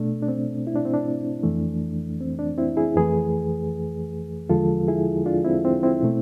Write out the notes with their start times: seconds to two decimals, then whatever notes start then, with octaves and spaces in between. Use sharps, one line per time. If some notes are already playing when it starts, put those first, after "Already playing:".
Already playing: B2 A3 D4
0.22 D4
0.28 C4
0.67 E4
0.76 D4
0.85 C4
0.94 D4
1.43 F2 E3 A3
2.20 C4
2.39 D4
2.58 C4 E4
2.77 E4 G#4
2.96 F2 E3 A3 G#4 B4
4.50 E2 D3 F3 G#3 F4 A4
4.88 E4 G#4
5.26 D4 F4
5.44 C4 E4
5.65 C4
5.83 C4 E4
6.02 B2 A3